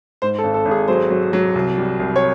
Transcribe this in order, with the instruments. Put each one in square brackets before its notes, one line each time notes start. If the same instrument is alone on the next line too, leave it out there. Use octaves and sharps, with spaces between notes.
[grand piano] G#2 [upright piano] C5
[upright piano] A4
[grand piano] G#1
[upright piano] A4
[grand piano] G#1
[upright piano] G#4
[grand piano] F#3 [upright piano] C5
[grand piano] F#3
F#3
C2
G3
C2
[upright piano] C#5